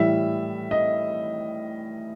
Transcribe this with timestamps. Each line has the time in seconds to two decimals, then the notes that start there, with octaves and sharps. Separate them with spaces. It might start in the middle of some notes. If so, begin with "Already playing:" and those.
Already playing: A2 E3 G3 E5
0.71 D#5